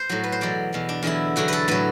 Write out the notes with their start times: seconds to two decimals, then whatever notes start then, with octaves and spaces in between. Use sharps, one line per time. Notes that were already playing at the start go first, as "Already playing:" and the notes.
Already playing: C5
0.09 A2 F#3
0.24 B4
0.32 C5
0.41 E2 B2 F#3 D5
0.73 E2 B2 F#3
0.89 D4
1.03 E2 D3 F#3 E4
1.36 E2 D3 F#3 F#4
1.48 A4 B4
1.68 A2 F#3 B4